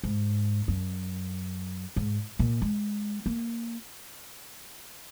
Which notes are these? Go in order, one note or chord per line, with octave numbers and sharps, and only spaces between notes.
G#2
F#2
G#2
A#2
G#3
A#3